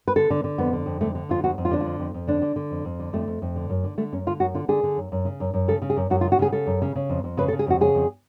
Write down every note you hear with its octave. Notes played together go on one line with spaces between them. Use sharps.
B4
D3 A4
D3
D3
F2 B3
D3
F2
D3 A3
D3
F2 F4
F2 F#4
F2
F4
D3 D4
F2 F4
F2
F2
D3 D4
D3
D3
F2
F2
D3
F2 A3
F2
F2
D3
F#2
D3
D3 A3
F#2 C#4
D3 F4
F#2 F#4
D3 F4
D3 G#4
D3
F#2
F#2
C#3
F#2
F#2
C#3 A4
C#3
G#4
F#2
F#2 F#4
F4
C#3
F#4
C#3 G#4
C#3 A4
F#2
C#3
C#3
F2
F2
C#3 B4
A4
C#3
G#4
F2 F#4
C#3 G#4
F2